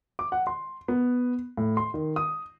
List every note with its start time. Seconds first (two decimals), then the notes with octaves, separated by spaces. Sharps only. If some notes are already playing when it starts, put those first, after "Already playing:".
0.19 D6
0.32 F#5
0.47 C6
0.88 B3
1.57 A2
1.77 C6
1.94 D#3
2.16 D#6